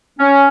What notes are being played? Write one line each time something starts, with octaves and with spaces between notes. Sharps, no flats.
C#4